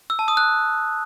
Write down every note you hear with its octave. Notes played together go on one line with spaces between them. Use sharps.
E6
A5
D#6
F#6